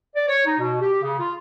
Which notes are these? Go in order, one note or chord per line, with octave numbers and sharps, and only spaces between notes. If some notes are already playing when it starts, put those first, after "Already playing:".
D5
C#5
D#4
B2
G4
C#3
F4